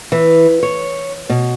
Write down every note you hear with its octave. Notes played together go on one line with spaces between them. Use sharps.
E3
C#5
B2